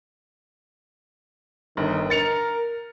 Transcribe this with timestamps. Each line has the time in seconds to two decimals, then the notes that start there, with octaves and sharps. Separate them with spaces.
1.77 G1 D#3
2.10 A#4 A6 C#7 F7